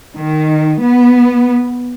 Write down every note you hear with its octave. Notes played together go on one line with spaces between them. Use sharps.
D#3
B3